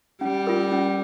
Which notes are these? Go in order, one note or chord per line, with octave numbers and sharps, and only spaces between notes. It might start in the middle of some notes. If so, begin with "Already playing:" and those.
G3 C#4
F4 A#4
C#4